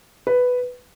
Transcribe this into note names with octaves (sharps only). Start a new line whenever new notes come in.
B4